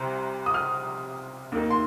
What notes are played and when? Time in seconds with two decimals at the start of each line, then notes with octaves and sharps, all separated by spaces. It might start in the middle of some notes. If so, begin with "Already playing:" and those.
Already playing: C2 C3 C6
0.46 D#6
0.54 F6
1.52 D#2 D#3 A#3 D#4
1.70 C6